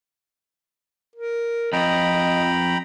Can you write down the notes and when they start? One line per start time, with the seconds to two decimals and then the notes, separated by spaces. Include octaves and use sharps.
1.16 A#4
1.73 F2 D#5 G5 A#5 B5